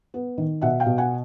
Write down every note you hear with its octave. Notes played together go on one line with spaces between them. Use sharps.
B3
D#3
B2 E5 F#5
F5 G5
B2
F#5 G#5